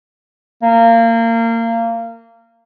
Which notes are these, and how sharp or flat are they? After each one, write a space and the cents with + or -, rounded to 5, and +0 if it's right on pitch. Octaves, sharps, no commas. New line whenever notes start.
A#3 -25